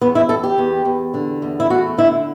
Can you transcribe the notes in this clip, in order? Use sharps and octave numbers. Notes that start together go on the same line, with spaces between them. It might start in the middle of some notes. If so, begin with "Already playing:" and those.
E2 B3
E4
E2 A4
G4
E2
E2
D3
E2
E4
A3 F#4
D3 E4